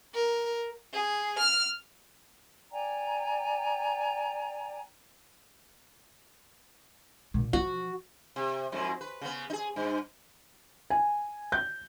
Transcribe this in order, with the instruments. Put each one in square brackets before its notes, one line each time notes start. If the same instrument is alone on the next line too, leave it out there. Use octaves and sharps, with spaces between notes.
[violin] A#4
[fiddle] G#4
F6
[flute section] D5 G5 G#5 A#5
[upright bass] A#2
[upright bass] F3 [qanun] F#4
[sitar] C3
F2 G#2 F#3
B4
C#3 B3
D#4 G#4
G2
[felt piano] G#5
G6